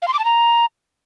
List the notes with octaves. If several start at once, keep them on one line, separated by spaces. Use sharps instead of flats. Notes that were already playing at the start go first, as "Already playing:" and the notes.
F5
C6
D6
A5
A#5